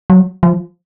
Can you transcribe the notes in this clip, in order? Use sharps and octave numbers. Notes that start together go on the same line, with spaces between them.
F#3
F3